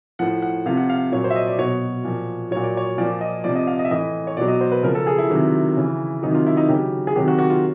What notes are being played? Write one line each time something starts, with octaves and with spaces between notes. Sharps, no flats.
A2 F3 F#5
F#5
C3 F3 F5
F#5
F5
A#2 F#3 C#5
C5
E5
D#5
D5
B2 F#3 C#5
A#2 F3
A#2 F#3 C#5
D5
C#5
A#2 F3 D5
D#5
C3 F3 D5
D#5
F5
D#5
E5
A2 E3 D#5
C#5
B2 F#3 D5
D#5
C5
B4
C#3 F3 A#4
A4
G#4
E4
C3 D#3 F#3
C#3 E3
C3 D#3 F#3 D#4
F4
E4
D#4
C#3 F#3 G4
G#4
C3 D#3 F#3 G4
F#4
F#4
F4